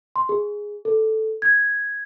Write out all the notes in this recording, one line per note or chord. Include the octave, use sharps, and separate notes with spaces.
C6
G#4
A4
G#6